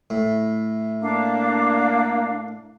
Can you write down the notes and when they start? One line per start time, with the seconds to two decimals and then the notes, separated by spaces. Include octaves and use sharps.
0.10 A2
1.02 A#3 D4 F5 D6